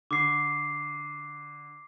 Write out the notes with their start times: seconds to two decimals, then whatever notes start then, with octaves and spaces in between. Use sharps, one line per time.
0.11 D3 D6 C7